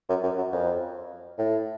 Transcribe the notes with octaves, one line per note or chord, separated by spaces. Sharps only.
F#2
F#2
F#2
F2
A2